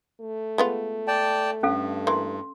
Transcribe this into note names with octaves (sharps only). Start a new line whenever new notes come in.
A3
G#3 B3 F4
D5 G5 A5
G2 C#4 A4 F5
E3 A#3 C6